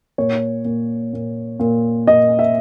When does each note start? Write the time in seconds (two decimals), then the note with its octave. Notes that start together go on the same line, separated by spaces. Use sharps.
0.18 A#2 C#5
0.65 A#2
1.13 A#2
1.60 A#2
2.07 A#2 D#5
2.39 E5